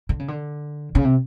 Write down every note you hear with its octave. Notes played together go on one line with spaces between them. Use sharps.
D3
C#3
D3
C#3
C3